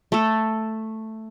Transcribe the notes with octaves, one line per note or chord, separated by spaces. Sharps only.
A3 A4